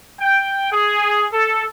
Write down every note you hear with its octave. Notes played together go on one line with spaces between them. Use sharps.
G5
G#4
A4